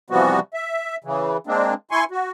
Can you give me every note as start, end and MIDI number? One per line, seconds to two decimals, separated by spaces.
0.10 0.40 48
0.10 0.40 52
0.10 0.40 53
0.10 0.40 55
0.10 0.40 59
0.10 0.40 66
0.54 0.96 76
1.04 1.37 49
1.04 1.37 52
1.47 1.74 56
1.47 1.74 58
1.47 1.74 60
1.47 1.74 62
1.91 2.04 64
1.91 2.04 80
1.91 2.04 84
1.91 2.04 85
2.11 2.31 66